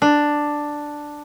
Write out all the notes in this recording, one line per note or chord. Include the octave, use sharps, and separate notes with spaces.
D4